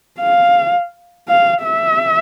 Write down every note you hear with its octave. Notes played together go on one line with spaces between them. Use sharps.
F5
F5
E5